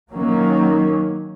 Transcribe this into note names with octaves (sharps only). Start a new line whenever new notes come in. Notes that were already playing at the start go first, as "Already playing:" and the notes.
D#3 F#3 A#3 C#4